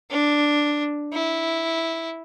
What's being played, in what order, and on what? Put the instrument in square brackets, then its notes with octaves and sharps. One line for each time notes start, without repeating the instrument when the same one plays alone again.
[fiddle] D4
E4